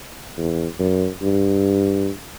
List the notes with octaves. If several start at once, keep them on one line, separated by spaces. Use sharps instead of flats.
E2
F#2
G2